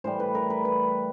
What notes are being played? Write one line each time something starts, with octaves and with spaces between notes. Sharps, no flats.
A2 E3 G3 C5
B4
A#4
B4
B4